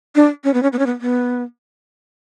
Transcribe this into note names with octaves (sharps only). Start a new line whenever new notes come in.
D4
C#4
B3
C#4
B3
C#4
B3
B3